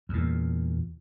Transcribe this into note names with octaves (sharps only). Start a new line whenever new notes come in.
E2 A#2